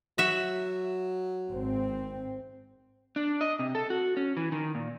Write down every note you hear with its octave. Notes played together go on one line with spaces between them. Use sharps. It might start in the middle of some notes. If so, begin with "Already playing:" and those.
F#3 F#4 E5
G#1 C4
D4
D#5
C3
A4
F#4
C#4
E3
D#3
A#2